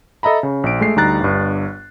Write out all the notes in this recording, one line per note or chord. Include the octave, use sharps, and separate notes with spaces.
A4 D#5 E5 A#5 B5
C#3
A#1 D7
G#3 A3 C7
D2 G3 D#4 A#5 F#6 A6
G1 G2